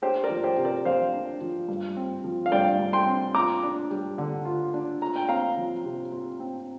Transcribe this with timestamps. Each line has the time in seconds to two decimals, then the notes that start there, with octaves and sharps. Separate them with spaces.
0.02 D4 G4 C5
0.24 A#4 D5
0.30 F3
0.44 G4 C5
0.58 C3
0.65 A#4 D5
0.85 F2 C5 F5
1.14 D4
1.41 F3
1.68 G2
1.97 C4
2.24 F3
2.46 F5
2.52 G2 D5 G5
2.79 G2
2.93 G5 C6
3.07 C4
3.35 F4 A#5 D6
3.63 D4
3.91 G3
4.18 D3
4.45 F4
4.74 D4
5.02 F4 A#5
5.16 G5
5.29 C4 F5 A#5
5.57 F3
5.85 C3
6.12 F4
6.40 C4